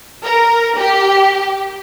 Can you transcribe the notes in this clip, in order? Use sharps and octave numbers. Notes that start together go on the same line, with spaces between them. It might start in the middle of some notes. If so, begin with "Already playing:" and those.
A#4
G4